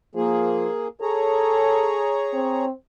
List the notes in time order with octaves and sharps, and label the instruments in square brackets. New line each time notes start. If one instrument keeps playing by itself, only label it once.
[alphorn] F3 [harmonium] A#3 G#4
[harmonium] G#4 C#5 A#5 [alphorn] A4
[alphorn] C4